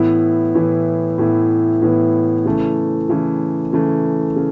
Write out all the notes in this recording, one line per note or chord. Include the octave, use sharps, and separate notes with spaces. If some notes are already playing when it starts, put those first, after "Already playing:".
Already playing: A2 E3 B3 E4
A2 E3 B3 E4
A2 E3 B3 E4
A2 E3 B3 E4
C#3 E3 A3
C#3 E3 A3
C#3 E3 A3
C#3